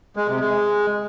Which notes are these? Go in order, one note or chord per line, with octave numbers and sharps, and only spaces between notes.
G#3
C3
G#3